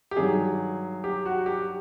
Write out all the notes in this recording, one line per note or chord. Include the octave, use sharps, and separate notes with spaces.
G4
G2 D#3 F#3 G#4
G4
F#4
G4